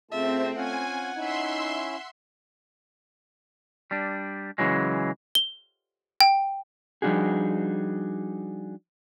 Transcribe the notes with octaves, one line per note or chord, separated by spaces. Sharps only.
C#3 A3 C4 F4 E5 A5
C#4 F4 F5 F#5 G#5
C#4 D#4 E4 E5 C6
G3 D4
C#3 E3 F#3 G#3
G7
G5
F3 G3 D4 D#4 F#4 G#4